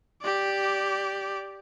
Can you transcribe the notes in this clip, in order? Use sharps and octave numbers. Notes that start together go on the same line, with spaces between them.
G4 D5